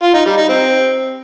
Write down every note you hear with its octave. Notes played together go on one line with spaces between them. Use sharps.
F4
D#4
G3
D#4
C4